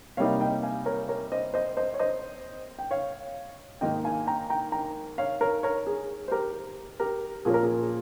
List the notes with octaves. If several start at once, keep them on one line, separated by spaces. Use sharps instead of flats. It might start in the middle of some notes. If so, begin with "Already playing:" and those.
C3 G3 A#3 D#4 C#5 F5
D#5 G5
F5 G#5
A#4 C#5
A#4 C#5
C5 D#5
C5 D#5
C5 D#5
C#5
C5 D#5
G5
C#5 F5
G#2 D#3 A#3 D#4 D#5 G5
F5 G#5
G5 A#5
G5 A#5
G5 A#5
C#5 F5
A#4 C#5
A#4 C#5
G#4
C5
G4 A#4
G4 A#4
A#2 F3 A#3 C#4 G#4
A#4
G#4